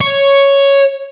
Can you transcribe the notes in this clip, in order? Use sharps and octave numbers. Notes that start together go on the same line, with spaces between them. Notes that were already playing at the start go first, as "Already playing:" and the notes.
C#5